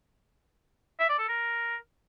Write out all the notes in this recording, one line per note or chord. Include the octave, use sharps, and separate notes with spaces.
E5
D5
A4
A#4